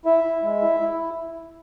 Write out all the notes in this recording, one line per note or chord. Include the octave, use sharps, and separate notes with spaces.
E4 E5
E4
G#3
E4
E4